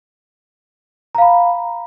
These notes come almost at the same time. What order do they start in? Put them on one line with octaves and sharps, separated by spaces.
A#5 F5 B5